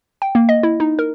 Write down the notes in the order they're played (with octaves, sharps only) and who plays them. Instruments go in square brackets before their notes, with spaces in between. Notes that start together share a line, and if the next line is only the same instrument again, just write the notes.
[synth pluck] G5
A#3
D#5
E4
D#4
A#4